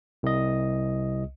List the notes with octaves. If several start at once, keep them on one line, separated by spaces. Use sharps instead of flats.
C2 D#5